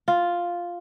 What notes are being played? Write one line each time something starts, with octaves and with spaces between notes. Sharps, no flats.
F4